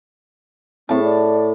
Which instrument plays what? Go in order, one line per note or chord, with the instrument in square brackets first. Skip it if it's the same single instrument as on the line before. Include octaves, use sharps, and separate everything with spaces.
[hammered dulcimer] A2 A5 [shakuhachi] C4
[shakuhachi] D5